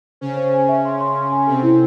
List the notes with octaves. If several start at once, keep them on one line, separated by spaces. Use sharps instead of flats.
C#3 C#4 C5
C5
G#5
E5
C6
C6
C6
G#5
C3 C4 A4
E4